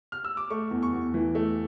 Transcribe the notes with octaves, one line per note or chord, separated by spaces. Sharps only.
F6
E6
D6
A3 C#6
E2
C#6
E2
E3
A3